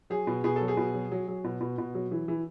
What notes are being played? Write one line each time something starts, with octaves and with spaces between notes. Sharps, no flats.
F#3 G#4
B2
B2 G#4
F#3 A4
G#4
B2
F#3
F#3
F#3
B2
B2
B2
F#3
E3
E3